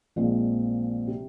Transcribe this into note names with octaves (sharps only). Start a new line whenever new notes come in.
A#1 A#2 F3 G#3 C4
C3